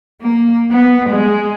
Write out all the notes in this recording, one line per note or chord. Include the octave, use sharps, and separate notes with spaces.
A#3
B3
G#3